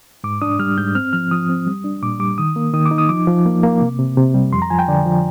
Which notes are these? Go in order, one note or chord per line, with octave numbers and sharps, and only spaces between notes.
G#2 D6
D4 D#6
G3 F6
G#2 G6
C4 F6
F3 F6
F3 D#6
C4
G3
D4
A#2 D6
G3 D6
D#3 D#6
A#3
D#3 D#6
D6
D#4
D#6
F3 D6
F3
A#3
A#3
C3
C3
C3
G3
F2 C6
A#5
F3 G#5
G5
D3 D5
F3